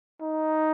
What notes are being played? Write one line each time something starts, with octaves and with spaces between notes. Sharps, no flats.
D#4